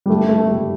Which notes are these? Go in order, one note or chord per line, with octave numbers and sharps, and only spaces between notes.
G3
A3
A3
G3